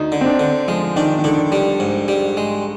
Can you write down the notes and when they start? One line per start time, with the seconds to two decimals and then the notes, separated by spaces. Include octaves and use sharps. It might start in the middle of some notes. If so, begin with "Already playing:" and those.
Already playing: D2 D#4
0.12 D3
0.21 C4
0.26 D4
0.40 D3
0.68 F3 G#3
0.96 D#3 D4
1.19 D#3
1.24 D3 D4
1.52 G3
1.80 G#2
2.08 G3
2.37 G#3